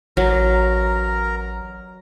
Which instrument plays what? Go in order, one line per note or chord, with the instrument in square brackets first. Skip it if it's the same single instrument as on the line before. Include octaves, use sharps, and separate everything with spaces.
[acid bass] A1 [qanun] F#3 [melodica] A#4 A#5